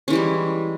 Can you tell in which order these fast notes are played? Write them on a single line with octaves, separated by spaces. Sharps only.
C#4 E3 G3 G#3